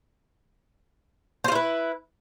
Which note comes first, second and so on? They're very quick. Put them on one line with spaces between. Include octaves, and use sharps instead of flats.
C5 F4 E4 B4